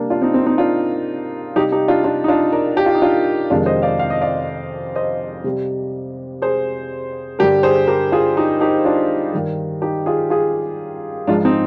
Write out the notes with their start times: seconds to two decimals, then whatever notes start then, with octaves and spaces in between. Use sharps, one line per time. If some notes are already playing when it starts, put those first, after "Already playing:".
Already playing: C3 G3 A#3 D4
0.10 D4 F4
0.22 C4 D#4
0.34 C4
0.46 C4 D#4
0.58 D4 F4
1.56 C3 G3 D#4 G4
1.72 D#4 G4
1.88 D4 F4
2.04 D4 F4
2.24 D#4
2.28 D4 F4
2.53 A#4 D5
2.77 G4
2.86 F4
2.95 D#4
3.02 D4 F4
3.50 F2 C3 D#3 G#3 D4 F4
3.66 C5 D#5
3.82 D5 F5
3.99 F5
4.10 D#5
4.21 D5 F5
4.96 C5 D#5
5.44 C3 G3
6.42 G#4 C5
7.39 G2 D3 G3 G4 A#4
7.63 G#4 C5
7.87 G4 A#4
8.12 F4 G#4
8.37 D#4 G4
8.60 D#4 G4
8.85 D4 F4
9.33 G2 D#3 G3
9.82 D#4 G4
10.06 F4 G#4
10.30 F4 G#4
11.27 G#2 F3 G#3 D4 F4
11.45 C4 D#4